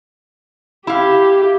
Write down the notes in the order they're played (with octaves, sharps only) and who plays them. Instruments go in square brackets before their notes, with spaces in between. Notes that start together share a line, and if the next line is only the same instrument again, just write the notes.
[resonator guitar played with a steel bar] E4 F5 [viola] G4